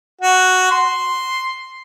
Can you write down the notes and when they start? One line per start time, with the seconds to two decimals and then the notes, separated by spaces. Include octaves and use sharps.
0.21 F#4
0.71 C6